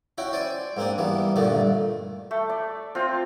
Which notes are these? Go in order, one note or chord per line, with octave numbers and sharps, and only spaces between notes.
C#4 E4 F#4 G5
C5 D5 G5 G#5
G#2 A#3 C4 D4 G#5
E3 G3 A#3 B3
G2 A#2 D3 D#3 A3 D4
A3
D5
C4 F4